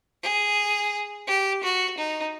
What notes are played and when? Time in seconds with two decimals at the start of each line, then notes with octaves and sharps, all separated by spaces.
0.23 G#4
1.28 G4
1.64 F#4
1.98 D#4